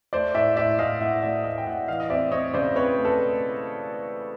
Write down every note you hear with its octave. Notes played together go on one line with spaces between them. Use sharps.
A3 C5 D5
A2 D5 E5
A2 D5 E5
A2 D#5 F5
A2 E5 F#5
A3 D5 E5
A3 D#5 F5
G5
A2 E5 F#5
E3 D#5 F5
D#5
C4 D5 E5
C4 C#5 D#5
C#3 C5 D5
C4 B4 C#5
A3
A4 B4
A3